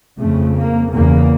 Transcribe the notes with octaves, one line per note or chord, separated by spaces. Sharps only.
F2 C#3 A3
A#3
E2 C#3 A#3